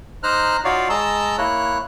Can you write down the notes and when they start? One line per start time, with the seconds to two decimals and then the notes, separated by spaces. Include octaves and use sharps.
0.23 D#4 C5 A#5 F6 F#6
0.64 D#4 F4 F#4 C#5 D5 F5
0.89 G#3 D#5 A5 A#5 E6
1.38 A#3 E4 C#5 F#6